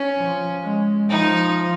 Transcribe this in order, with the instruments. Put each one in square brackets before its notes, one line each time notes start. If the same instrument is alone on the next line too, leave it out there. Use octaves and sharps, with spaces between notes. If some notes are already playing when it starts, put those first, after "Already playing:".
Already playing: [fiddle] C#4
[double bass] F3
G#3
[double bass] F3 [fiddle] D#4